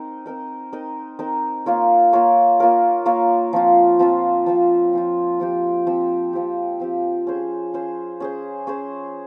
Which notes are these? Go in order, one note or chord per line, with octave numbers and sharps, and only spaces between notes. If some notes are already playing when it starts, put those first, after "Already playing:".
Already playing: C4 D#4 A#4 D#5
C4 D#4 A#4 D#5
C4 D#4 A#4 D#5
C4 D#4 A#4 D#5
A#3 F4 A#4 C#5
A#3 F4 A#4 C#5
A#3 F4 A#4 C#5
A#3 F4 A#4 C#5
F3 C4 F4
F3 C4 F4
F3 C4 F4
F3 C4 F4
F3 C4 G4
F3 C4 G4
F3 C4 G4
F3 C4 G4
C#4 G#4 C5
C#4 G#4 C5
C#4 G#4 C5
C#4 G#4 C5